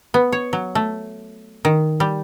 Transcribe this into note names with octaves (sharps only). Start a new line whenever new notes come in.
B3
C#5
F#3
A3
D#3
G3